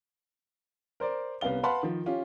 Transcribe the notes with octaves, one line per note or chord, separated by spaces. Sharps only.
A#4 C5 D5
C2 B3 C#4 F5 G7
B4 F5 F#5 A5 B5 C6
D#3 F3
C#4 F4 G4